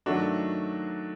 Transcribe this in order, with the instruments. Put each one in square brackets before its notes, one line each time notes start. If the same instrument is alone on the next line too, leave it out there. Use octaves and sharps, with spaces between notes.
[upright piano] D#3 F#3 A3 D4 F#4